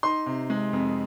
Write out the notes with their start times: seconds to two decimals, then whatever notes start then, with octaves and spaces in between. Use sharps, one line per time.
0.03 D#4 C6
0.26 C3
0.50 G#3
0.73 F2